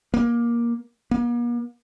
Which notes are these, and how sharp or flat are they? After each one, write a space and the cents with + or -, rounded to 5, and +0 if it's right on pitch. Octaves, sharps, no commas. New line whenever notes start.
A#3 +15
A#3 +45